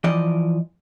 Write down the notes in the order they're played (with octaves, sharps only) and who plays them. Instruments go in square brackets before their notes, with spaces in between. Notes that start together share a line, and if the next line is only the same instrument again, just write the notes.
[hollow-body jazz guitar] E3 F3 D5 D#5